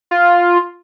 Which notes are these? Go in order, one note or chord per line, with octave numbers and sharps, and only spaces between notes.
F4